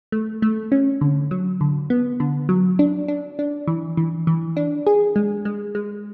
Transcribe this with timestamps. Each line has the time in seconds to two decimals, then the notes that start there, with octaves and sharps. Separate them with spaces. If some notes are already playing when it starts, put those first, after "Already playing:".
0.12 A3
0.42 A3
0.72 C#4
1.01 D3
1.31 F#3
1.61 D3
1.90 B3
2.20 D3
2.49 F#3
2.79 D4
3.08 D4
3.39 D4
3.67 E3
3.97 E3
4.27 E3
4.57 D4
4.87 G#4
5.16 G#3
5.45 G#3
5.75 G#3